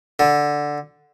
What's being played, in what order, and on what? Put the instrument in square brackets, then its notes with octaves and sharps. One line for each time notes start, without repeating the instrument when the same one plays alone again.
[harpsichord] D3